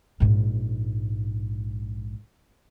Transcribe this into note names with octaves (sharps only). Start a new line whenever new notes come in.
A#1 G#2